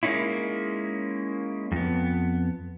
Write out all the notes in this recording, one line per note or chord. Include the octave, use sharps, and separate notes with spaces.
G#3 A#3 C4 C#4 D#4 E4
F2 B3